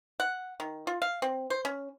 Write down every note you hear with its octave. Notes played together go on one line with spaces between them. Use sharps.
F#5
D#3
F4
F5
C4
C5
C#4